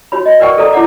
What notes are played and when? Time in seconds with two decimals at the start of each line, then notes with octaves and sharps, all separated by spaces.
0.12 F#4 C#5 B5
0.26 D#5
0.40 A#4 B4 D5 F#5 G5 C#6
0.57 G#4 A4 C5 D5 A#5
0.73 E4 C#5 F#5 D6